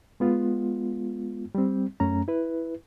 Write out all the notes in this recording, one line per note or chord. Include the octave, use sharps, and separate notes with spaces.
G#3 B3 F4
G3 C4
F#2 A3 C#4 A#5
E4 B4